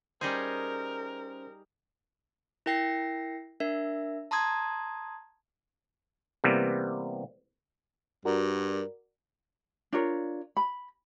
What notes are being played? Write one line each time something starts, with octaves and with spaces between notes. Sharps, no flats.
G3 C#4 D#4 G#4 A#4 C5
E4 A#4 G5 A#6 C7
D4 A#4 E5
A5 A#5 C6 D#6 G#6
C3 E3 G3 A#3 B3
G2 F#4 A#4 D5
D4 F4 A#4 C#5
B5